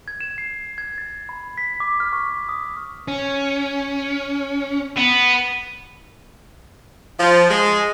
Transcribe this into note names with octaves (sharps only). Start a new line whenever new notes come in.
G#6
E7
C7
G#6
A6
B5
B6
D6
F6
C#6
D#6
C#4
B3
F3
G#3